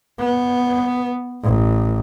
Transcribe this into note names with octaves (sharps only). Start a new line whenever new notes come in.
B3
A1